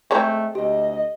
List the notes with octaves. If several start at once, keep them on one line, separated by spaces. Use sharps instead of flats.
G#3 A3 C4 C#5 A#5 B5 G6
D2 G4 D#5